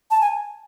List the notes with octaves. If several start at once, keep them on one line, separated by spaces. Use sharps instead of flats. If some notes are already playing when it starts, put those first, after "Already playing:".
A5
G#5